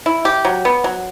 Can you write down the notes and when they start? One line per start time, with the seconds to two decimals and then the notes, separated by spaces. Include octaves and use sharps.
0.06 E4
0.25 G4
0.45 F#3
0.65 B3
0.84 F#3